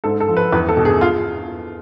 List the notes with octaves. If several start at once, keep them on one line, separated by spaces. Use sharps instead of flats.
G#2 A4
A4
F3
B4
E2 B4
A4
B2
G#4
F4